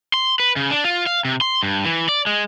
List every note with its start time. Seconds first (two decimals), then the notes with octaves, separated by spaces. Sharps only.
0.14 C6
0.40 B4
0.56 C#3
0.71 D4
0.84 F4
1.06 F5
1.25 C3
1.41 C6
1.63 G2
1.84 E3
2.09 D5
2.27 G#3